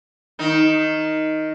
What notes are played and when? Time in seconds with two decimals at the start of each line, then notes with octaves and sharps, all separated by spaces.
0.39 D#3 D#4